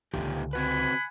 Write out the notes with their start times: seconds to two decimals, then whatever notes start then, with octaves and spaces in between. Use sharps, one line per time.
0.13 C#2 A#2 D3 D#3 G4
0.53 C4 F#4 B4 F#5 G#5 B5